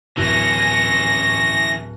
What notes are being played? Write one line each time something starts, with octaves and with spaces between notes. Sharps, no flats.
D1 E3 C#4 A#6